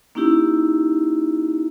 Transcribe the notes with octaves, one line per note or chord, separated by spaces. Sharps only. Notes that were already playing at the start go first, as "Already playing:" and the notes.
A#3 C#4 D#4 E4 G4